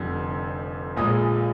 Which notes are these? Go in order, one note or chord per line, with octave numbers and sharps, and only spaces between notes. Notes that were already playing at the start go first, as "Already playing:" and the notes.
Already playing: F1 F2 D3 G3
A#1 A#2 G#3 D#6